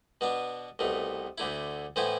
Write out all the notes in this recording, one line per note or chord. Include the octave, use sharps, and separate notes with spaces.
B2 B3 D4
C2 B2 A3
D2 D3 A3 E4
A2 E3 B3 E4 C5